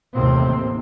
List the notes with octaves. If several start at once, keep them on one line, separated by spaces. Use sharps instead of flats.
A1 D#2 C3 C4